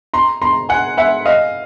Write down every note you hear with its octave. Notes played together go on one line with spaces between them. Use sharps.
A#5 C6
A#5 C6
F#5 G#5
E5 F#5
D#5 F5